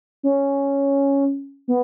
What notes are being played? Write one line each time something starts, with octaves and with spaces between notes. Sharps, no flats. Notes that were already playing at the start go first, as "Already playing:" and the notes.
C#4
B3